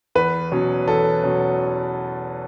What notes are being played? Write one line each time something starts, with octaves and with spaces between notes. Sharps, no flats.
E2 B4
B2 F#3 C#4
E2 A4
B2 F#3 C#4